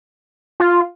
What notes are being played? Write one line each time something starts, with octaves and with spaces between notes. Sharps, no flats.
F4